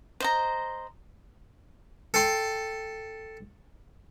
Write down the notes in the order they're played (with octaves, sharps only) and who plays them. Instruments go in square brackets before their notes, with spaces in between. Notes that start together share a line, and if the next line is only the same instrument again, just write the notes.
[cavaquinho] C5 D#5 A#5
[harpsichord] A4 G5 C6